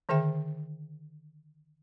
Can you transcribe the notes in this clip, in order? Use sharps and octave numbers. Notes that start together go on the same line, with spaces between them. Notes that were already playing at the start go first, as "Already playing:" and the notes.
D3 D#3 G#4 C5 E5 G5